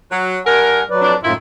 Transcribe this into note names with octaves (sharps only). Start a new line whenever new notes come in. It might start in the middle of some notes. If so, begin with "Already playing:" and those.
F#3
G2 A#4 F#5 G#5
F#3 B4 D5
F2 D4
F#2 A2 D#3 E4 F4